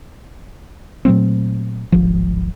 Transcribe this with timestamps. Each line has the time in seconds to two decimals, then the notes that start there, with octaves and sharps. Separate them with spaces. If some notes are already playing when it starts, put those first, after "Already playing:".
1.05 A#2 F#3 A3 C4
1.92 D1 G#1 F3